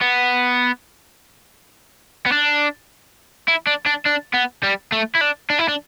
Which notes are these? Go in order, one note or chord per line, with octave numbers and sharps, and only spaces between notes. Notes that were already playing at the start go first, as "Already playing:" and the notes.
B3
B3
D4
E4
D4
D4
D4
B3
G3
A3
E4
D4
D4
E4
D4